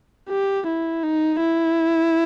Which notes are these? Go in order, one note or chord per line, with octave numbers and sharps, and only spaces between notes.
G4
E4
D#4
E4